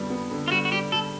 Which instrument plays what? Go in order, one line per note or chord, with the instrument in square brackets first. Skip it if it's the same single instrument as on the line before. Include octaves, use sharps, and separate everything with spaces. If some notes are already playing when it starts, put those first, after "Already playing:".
Already playing: [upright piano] F2 D3 G3 B3
B3
D3
[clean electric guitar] F4
[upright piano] G3 [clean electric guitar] F#4
[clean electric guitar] F#4
[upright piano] G3 [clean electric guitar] G4
[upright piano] G3 [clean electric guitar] A4